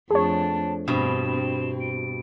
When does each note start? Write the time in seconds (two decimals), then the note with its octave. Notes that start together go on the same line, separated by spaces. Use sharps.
0.11 F2 A3 D4 G#4 C#5 A5
0.88 G2 B2 C4 E7
1.29 C4
1.80 D7